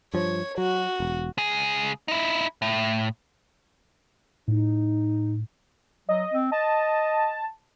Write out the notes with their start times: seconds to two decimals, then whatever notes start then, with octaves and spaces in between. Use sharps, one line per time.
0.14 G2 F3 C#5
0.58 F#3 F#4
1.00 E1
1.38 C#2 G#4
2.08 D#4 E4
2.62 A2
4.48 A2 D#4
6.09 F#3 D#5
6.34 C4
6.52 D#5 A5